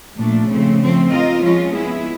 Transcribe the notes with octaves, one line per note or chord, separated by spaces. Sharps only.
A#2 F3 A3 D4
C#3 F3 A3 C4
F3 A3 C4
C4 F4 A#4 D#5
F3 G#3 C#4 F4
G#3 B3 E4 G#4